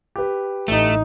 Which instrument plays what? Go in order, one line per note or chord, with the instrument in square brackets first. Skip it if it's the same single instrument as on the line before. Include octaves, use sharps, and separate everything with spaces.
[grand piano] G4 B4
[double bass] A1 D#4 [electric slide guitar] A3